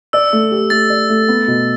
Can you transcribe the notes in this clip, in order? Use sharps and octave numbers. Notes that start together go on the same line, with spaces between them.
D5 E6
A3
G4
A3 A6
D5
A3
B3
B2